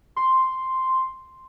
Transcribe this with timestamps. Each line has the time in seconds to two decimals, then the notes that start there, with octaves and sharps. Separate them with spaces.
0.16 C6